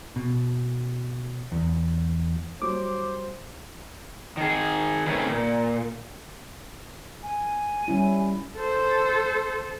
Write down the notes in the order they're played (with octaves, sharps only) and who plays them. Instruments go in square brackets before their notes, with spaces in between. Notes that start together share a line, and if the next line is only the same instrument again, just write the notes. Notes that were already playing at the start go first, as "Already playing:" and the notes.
[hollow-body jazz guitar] B2
E2
[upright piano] F#3 G3 [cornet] C5 [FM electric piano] D6
[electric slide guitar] D#3 G#4
C3 D#3 A3 C#4 G#4 B4
A#2
[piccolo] G#5
[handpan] G3 C#4 E4
[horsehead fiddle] A4 C5